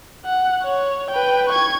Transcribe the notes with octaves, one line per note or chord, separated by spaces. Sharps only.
F#5
C#5
B4 G5
C#6 G#6